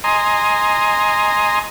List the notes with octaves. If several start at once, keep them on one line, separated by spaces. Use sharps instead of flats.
D#5 G#5 A#5 C6